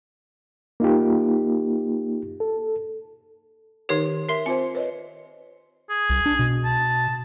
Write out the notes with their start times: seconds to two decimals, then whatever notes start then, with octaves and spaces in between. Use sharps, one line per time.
0.80 A#3 D#4 F4 G4
2.40 A4
3.89 D#3 D#4 G4 A#4 C#5 C7
4.29 A#4 E5 C6 C7
4.46 C4 F4 C5 C#7
4.75 B4 C#5 D#5
5.90 G#4
6.10 C2
6.26 D4
6.39 B2
6.65 A5